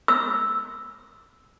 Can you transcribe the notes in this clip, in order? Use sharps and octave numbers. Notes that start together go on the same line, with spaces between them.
E6